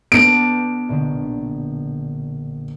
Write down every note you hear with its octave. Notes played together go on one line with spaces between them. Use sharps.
B3 D4 D7
A#1 B2 D3